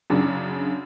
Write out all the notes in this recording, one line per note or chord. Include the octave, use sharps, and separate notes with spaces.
F#2 C#3 D4